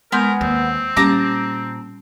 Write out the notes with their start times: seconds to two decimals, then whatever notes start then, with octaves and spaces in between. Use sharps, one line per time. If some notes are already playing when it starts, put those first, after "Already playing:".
0.12 G#3 B3 A#4 G#5 C6 G6
0.41 D#2 C4
0.97 A#2 G3 C#4 G4 A5 A#5 D6